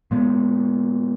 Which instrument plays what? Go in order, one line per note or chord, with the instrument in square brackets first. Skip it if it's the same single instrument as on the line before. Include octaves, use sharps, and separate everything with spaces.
[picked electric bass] A#2 G#3 B3